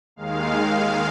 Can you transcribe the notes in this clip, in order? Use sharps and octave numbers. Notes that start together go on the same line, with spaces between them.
D#2 D#3 G#3 F5